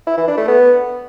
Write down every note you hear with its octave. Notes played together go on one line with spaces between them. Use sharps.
E4
E3
D4
A3
B3